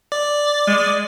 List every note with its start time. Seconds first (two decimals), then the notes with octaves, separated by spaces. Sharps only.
0.12 D5
0.67 G#3